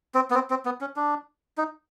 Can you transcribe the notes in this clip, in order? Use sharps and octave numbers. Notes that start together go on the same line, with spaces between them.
C4
B3
C4
C4
B3
C#4
D4
D#4